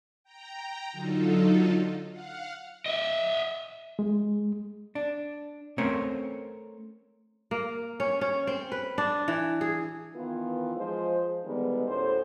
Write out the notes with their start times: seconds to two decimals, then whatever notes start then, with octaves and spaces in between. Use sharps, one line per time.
0.24 G5 A#5
0.92 D3 F#3 D#4 F4 A4
2.09 F5 F#5
2.86 D#5 E5
3.99 G#3
4.95 D4
5.78 A3 C4 C#4 A#4 C5 C#5
7.51 A#3
8.00 C#4
8.21 C#4
8.47 C4
8.72 B4
8.98 D4
9.28 E3
9.61 G#4
10.14 D#3 E3 B3 F4
10.76 F3 G#3 F4 C5
11.44 D3 D#3 G3 G#3 B3
11.87 D2 A2 C#4 C5